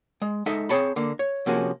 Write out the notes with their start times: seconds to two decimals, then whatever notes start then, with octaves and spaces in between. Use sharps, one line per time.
0.22 G#3
0.46 G#3 D#4 A4 E5 A#5
0.69 C4 G#4 C#5 A5 B5
0.96 D3 A#3
1.19 C#5
1.46 C3 F3 A#3 C#4 F#4 G#4